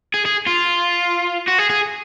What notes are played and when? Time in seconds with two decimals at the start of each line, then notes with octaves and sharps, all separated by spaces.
0.14 G#4
0.25 G#4
0.47 F4
1.48 F#4
1.58 G#4
1.70 G#4